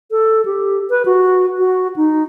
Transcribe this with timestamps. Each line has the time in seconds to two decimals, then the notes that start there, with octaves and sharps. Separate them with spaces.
0.11 A4
0.45 G4
0.90 B4
1.05 F#4
1.58 F#4
1.96 D#4